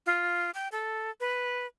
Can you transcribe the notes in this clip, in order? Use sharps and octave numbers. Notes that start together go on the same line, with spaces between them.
F4
G5
A4
B4